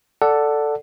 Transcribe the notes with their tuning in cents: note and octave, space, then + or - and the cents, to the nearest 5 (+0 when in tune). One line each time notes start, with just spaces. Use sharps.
A4 +5 D5 +0 F#5 +0